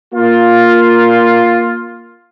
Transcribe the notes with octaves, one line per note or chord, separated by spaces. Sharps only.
A#3 F4